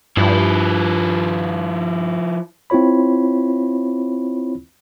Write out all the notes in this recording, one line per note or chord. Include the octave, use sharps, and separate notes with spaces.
G2 F3 E4
C4 E4 F4 C#5 B5